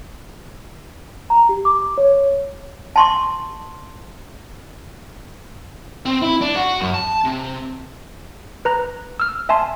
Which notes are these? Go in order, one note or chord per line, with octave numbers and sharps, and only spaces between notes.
A#5
G4
D6
C#5
A5 C6 C#6
C4
E4
D4
F#4
F#2
A5
C3
B4 A#5 F#6
E6 F6
E5 G#5 A5 C6